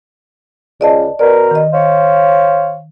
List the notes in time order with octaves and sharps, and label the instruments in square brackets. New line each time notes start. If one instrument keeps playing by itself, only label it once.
[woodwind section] C#2 [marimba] D5 D#5 A5
[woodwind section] B2 A#4 [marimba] D5
[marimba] D#3 D#5
[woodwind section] C5 C#5 F5